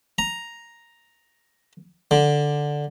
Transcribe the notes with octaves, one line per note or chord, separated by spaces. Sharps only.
A#5
D3